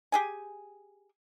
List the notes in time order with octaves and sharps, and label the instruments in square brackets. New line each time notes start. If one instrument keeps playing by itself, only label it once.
[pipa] G4 G#4 G#5